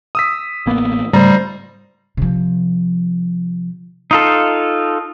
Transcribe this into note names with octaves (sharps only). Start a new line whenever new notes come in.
D#6 E6 B6
A1 A#3 B3
G#2 C#3 G3 A3 C5 A#5
C3 F3
D#4 F4 A4